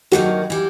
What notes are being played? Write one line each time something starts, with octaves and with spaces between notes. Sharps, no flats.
G2 D#3 F#3 A#3 F#4
E3 G3